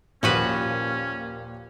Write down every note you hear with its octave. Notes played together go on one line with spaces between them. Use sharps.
D#2 A#2 F3 C#4 F#4 B4